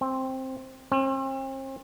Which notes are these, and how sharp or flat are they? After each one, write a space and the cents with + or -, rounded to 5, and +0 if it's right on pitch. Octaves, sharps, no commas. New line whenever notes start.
C4 +5
C4 +40